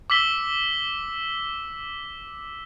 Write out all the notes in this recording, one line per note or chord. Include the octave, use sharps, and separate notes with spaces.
D6 E6 B6 G7